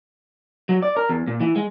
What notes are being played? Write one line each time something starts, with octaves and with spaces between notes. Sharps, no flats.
F#3
D5
A#4
E2
A#2
E3
G#3